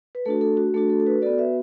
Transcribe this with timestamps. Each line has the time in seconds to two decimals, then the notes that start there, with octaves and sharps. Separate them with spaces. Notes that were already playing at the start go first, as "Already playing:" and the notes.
0.15 B4
0.26 A3 D4 F#4 A4
0.41 A4
0.57 F#4
0.74 A3 D4 F#4 A4
0.90 A4
1.00 A4
1.06 F#4 B4
1.22 B3 F#4 A4 D5
1.38 B4 E5